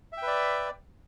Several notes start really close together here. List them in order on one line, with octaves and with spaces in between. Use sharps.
E5 G5 B4 D5